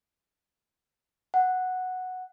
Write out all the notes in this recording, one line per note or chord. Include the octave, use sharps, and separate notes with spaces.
F#5